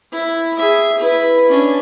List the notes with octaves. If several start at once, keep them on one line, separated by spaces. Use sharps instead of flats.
E4
G#4 E5
E4 B4
C#4 D4